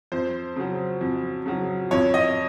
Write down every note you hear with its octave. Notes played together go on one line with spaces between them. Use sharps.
F2 C5
C#3 F#3
F2
C#3 F#3
F2 C#5
D#5